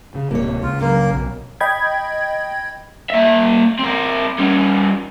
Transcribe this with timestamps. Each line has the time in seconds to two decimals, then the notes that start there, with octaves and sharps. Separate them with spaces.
0.15 C#3
0.31 D1 C3 A#3 C#5
0.63 C#2 F4
0.81 F#2 A2 C#3 A#3
1.13 B1
1.61 D#5 G5 B5 G#6
3.10 A#3 E5
3.80 C4 A#4
4.39 G3 C#4